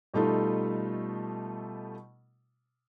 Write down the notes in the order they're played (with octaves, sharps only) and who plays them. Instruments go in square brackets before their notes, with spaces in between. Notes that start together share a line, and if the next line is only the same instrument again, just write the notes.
[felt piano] B2 G3 A3 D#4 F4 A4